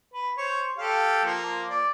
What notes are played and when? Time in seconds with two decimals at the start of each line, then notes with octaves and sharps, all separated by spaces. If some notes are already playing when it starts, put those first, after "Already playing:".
0.13 B4
0.38 C5 C#5
0.78 G4 A4 F5
1.25 F3 A#3
1.70 D5